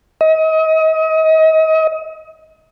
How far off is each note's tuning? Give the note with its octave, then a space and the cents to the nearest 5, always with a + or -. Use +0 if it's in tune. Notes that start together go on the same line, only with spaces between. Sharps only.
D#5 +35